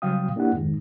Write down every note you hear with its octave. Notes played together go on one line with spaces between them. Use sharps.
C#3 F#3 G3 F5 G5 D#6
A#3 D4 E4 G4 F#5
F2 G#2 D#3 G#3